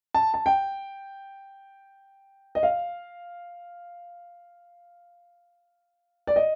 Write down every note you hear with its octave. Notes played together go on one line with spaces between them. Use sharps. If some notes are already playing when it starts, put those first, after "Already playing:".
A5
A5
G5
D#5
F5
D5
D#5